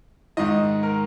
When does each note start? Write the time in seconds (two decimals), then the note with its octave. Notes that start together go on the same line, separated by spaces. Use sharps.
0.37 G#2 D#3 D#5
0.83 A#4